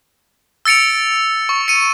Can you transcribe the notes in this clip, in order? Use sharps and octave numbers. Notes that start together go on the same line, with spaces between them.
E6 A6 C#7 D7 F7
C#6
C#7 D#7